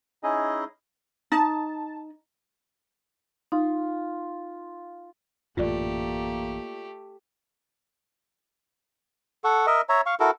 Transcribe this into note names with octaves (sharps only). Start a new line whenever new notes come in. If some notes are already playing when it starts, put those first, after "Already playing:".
C#4 D#4 E4 G#4 D#5
D#4 A5
D#4 F4
A1 F#2 A#2 A3 A#3 F4 G4 D5
A4 F#5 C#6
A#4 D#5 E5
C#5 E5 A#5
F5 C#6
E4 F#4 A4 A#4